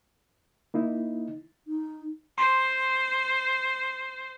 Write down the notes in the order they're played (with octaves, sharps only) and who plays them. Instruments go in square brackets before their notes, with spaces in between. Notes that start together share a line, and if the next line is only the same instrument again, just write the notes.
[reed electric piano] A#3 D#4 E4
[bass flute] D#4
[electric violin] C5 [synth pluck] C6